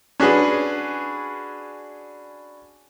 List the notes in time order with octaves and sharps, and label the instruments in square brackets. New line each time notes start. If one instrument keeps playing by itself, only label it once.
[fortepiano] C#4 D4 F#4 G#4 B4